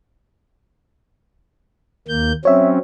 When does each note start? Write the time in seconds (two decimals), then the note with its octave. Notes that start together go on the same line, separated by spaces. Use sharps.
2.08 D#2 A#3 G6
2.45 F#3 C4 C#4 C#5 E5